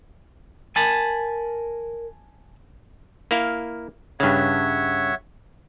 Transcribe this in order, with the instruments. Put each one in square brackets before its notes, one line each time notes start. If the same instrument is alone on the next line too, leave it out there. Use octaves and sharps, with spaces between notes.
[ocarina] A#4 [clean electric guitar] G#5 A5 B5
[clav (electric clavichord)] A#3 E4 F5
[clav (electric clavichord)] G2 C#3 [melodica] C#5 E5 F#5